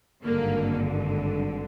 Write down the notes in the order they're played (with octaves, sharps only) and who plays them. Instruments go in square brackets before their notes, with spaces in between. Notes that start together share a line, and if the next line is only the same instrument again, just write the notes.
[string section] G#1 G2 D3 A#3